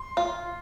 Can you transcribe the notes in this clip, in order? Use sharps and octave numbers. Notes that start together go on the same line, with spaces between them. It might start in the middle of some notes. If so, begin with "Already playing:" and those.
Already playing: C6
F4